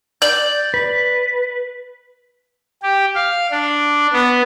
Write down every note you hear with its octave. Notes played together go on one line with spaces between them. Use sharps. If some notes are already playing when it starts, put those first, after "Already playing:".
D5 G6
B4
G4
F5
D4
B3